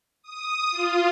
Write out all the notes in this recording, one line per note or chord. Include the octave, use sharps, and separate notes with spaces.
D#6
F4